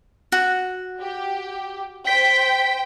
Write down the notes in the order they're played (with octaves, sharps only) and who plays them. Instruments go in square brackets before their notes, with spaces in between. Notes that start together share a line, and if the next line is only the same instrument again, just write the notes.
[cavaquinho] F#4
[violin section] G4
[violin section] C5 G5 [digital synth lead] B6